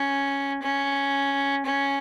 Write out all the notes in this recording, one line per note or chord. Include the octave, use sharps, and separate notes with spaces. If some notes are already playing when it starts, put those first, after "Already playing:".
Already playing: C#4
C#4
C#4